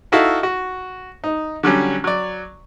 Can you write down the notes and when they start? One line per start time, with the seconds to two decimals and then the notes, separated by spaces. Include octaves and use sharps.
0.12 D#4 E4 F#4 A4 E5 F5
0.43 F#4
1.24 D#4
1.63 D3 F#3 G3 C#4
2.04 F#3 D5